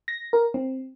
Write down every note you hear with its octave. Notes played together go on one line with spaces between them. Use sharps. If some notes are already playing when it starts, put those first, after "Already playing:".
A#6
A#4
C4